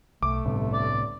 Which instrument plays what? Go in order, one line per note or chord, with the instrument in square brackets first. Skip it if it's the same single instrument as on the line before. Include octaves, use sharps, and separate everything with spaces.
[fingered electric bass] B1 [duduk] A3 [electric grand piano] D6
[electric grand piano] G1 [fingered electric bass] C2 A2 C3
[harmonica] D5